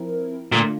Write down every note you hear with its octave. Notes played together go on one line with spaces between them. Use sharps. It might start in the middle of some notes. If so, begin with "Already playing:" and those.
Already playing: F3 C4 E4 A#4
A#2 D3 A3 D4 F4